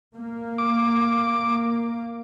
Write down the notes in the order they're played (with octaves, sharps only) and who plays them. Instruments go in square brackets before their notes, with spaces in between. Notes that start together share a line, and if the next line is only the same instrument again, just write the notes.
[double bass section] A#3
[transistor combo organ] D6